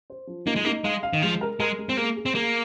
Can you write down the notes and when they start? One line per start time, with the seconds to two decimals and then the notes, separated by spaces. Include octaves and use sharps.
0.10 C5
0.27 F3
0.46 A#3 D#4
0.56 G#3
0.65 A#3 D#4
0.84 G#3 F5
1.03 F5
1.13 D#3
1.22 F3 G#3
1.41 A#4
1.60 G#3 A#4
1.78 G#3
1.89 C4
1.97 A#3 G#4
2.16 G#4
2.26 C4
2.35 A#3 G#4